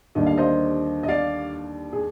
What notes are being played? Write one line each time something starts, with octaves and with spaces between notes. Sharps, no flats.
D#2 D3 G3 A#3 D#5
F5
C5 D#5
D#5
D5 F5
G#4